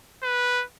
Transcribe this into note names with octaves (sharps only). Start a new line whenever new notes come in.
B4